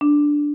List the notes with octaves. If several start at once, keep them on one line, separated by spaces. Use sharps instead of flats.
D4